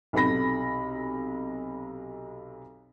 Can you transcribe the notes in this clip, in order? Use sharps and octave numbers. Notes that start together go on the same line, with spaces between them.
B1 C3 A4 B5 A#6